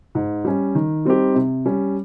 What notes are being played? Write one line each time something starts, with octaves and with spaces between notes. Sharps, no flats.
G#2
G3 C#4
D#3
G3 C4 D#4 G4
C3
G3 C#4